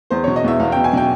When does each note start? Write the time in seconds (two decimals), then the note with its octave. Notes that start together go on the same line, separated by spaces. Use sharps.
0.10 E2 C5
0.24 B2 C#5
0.36 D#5
0.44 E2 E5
0.60 E2 F5
0.72 B2 G5
0.84 G#5
0.93 B2 G5